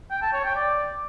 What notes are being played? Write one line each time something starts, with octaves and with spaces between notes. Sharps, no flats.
G5
A5
C#5
G5
D5